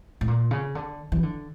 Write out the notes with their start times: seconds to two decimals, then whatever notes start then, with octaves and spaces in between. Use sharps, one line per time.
0.21 A2
0.28 A#2
0.51 C#3
0.75 D3
1.12 E3
1.23 D3